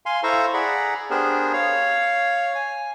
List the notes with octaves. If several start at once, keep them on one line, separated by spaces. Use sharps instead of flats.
F5 G#5 C6
E4 A4 C5 F5 A#5 C#6
G#4 D5 F#5 A#5 B5
B3 D4 G4 G#4 A#4 C5
C#5 F5
G#5